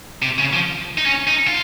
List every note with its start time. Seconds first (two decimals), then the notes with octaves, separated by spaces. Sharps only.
0.22 C3
0.39 C#3
0.53 F3
0.98 D#4
1.06 C#4
1.27 D#4
1.48 F4